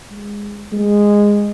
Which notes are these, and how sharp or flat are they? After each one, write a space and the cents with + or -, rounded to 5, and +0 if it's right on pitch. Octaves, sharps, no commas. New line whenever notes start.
G#3 -15
G#3 -10